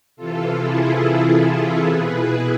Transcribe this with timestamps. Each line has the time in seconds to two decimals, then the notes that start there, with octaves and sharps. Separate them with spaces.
0.16 C3 E3 F4 A4
0.60 E4 G#4
1.03 E4
1.32 F4
1.60 F4 A4
1.89 B2 G#4 B4
2.18 E4 G#4